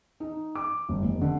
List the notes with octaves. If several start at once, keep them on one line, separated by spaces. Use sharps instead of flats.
D#4
D6
G1
F1
D3